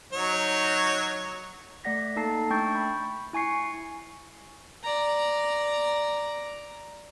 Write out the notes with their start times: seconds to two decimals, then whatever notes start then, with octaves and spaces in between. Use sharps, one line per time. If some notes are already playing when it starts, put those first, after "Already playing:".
0.13 F#3 D#4 C#5
1.84 A3 D5 F#5 A#6 B6
2.16 A#3 D#4 A4 A5 C7
2.50 A3 D4 G5 C#6 G6 A6
2.75 B5 C#6
3.33 E4 G#5 C#6 C7 C#7
4.84 D5 A#5